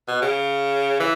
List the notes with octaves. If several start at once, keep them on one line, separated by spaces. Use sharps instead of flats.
B2
C#3
E3